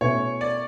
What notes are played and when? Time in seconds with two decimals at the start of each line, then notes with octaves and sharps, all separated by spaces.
0.01 B2 A3 C#4 E4 C#5
0.41 D5